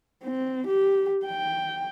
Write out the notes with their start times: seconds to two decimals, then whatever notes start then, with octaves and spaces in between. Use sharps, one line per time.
0.24 C4
0.67 G4
1.26 G5